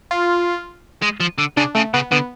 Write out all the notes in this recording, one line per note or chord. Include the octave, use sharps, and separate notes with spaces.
F4
G#3
F3
D3
C#3 D4
C#3 A3
C#3 B3
D3 B3